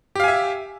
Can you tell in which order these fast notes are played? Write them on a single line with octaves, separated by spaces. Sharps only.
G4 F5 G#5 E5